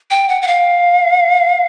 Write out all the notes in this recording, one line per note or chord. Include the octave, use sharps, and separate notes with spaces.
G5
F#5
F#5
F5